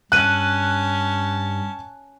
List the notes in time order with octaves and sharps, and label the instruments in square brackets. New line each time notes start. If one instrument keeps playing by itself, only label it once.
[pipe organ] G2 [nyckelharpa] C#4 A5 [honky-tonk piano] F#6 D#7